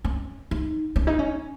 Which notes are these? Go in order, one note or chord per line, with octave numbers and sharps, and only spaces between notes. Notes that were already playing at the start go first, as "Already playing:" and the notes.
C#4
D#4
C#4
D#4
C#4